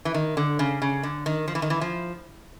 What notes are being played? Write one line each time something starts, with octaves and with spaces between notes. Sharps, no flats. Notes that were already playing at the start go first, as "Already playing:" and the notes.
E3
D#3
D3
C#3
C#3
D3
D#3
F3
E3
D#3
E3
F3